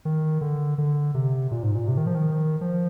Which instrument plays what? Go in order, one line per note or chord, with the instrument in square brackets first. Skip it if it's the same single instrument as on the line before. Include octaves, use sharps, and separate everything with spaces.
[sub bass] D#3
D3
D3
C3
A#2
G#2
A#2
C3
D#3
F3
D#3
F3